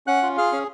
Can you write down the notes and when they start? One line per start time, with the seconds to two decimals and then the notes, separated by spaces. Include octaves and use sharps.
0.07 C#4 F#5 F#6
0.23 F4
0.38 G#4 F5 F6
0.52 C#4